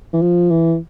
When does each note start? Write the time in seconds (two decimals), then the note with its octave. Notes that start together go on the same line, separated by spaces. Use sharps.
0.13 E3
0.22 F3
0.51 E3